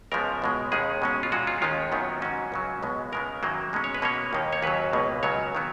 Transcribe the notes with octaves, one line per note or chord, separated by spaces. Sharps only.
C#2 C#3 F3 G#3 B3 A#4
C#2 B2 G#3
D#2 D#3 G#3 C#4 G#4
B2 G#3 C#4
F4
A#2 G#3 C#4 F#4
F4
D#2 D#3 G#3 C#4 F4
F#2 D#3 F#3 B3
G#2 F#3 C#4 F#4
C#2 C#3 F#3
C#2 B2 G#3 B3
C#2 C#3 G#3 B3 A#4
F#2 D#3 F#3 A#3
B2 G#3 C#4
C#5
B4
B2 A#3 C#4 C#5
D#2 D#3 A#3
C#5
D#2 C#3 F#3 B4
C#2 B2 A#3
C#2 C#3 F#3 C#5
D#3 F#3 B3